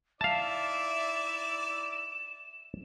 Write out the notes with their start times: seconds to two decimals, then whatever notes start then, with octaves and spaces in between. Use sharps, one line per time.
0.21 D#4 E4 D5 E5 F5 A5 E7